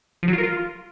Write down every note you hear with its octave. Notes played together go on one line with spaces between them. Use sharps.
F3
F#3
F4
A#4
F4